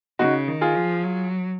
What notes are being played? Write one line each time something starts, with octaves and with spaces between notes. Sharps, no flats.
C#3 D#4 F#4
D#3
F4 G#4
F3
F#3